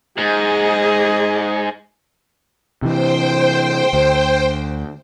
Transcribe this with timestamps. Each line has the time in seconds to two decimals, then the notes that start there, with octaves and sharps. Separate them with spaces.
0.18 G#2 G#4 D#5
2.82 C3 E3 C5 G5
3.93 D2